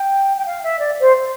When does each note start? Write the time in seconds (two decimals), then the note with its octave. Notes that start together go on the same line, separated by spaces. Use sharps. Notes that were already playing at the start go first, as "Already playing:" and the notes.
Already playing: G5
0.37 G5
0.46 F5
0.63 E5
0.79 D5
1.00 C5